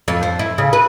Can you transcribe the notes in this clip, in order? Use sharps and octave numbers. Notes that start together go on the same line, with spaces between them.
F2
C5
E4
C#3
B4